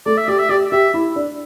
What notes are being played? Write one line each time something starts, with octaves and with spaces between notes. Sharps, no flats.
A3 D5
E5
G4 D5
E5
G4 D5
G4 E5
E4
D4